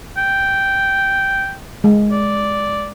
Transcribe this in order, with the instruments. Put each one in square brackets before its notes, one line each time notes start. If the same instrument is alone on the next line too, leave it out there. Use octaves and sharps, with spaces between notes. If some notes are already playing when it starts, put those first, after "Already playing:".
[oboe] G5
[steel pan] G#3
[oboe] D5